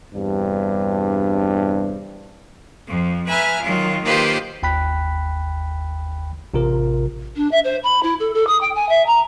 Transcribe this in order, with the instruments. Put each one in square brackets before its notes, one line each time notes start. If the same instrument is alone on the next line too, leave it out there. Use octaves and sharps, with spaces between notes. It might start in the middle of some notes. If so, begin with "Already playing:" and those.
[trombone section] E2 G2 C3 D4
[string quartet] F2 F3
B4 E5 G#5 A#5 F6
D#3 F#3 F4
D#3 A#3 F4 G4 B4 C5
[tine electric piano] G1 D#2 G5 B5 F#6 B6
A1 C3 F4 A#4
[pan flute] D4
E5
C5
B5
E4
A4
A4
D#6
G5
G#5
E5
A#5